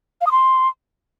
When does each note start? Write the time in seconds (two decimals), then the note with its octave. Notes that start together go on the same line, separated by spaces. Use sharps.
0.21 F5
0.26 D#6
0.32 C6